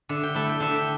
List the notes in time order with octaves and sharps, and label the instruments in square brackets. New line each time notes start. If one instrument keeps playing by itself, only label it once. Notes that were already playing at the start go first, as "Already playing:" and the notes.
[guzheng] D3 E5
G5
A3 E4 E5
G5
D3 E5
G5